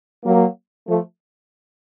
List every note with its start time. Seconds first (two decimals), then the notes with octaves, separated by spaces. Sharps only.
0.24 F#3 A#3
0.87 F3 A3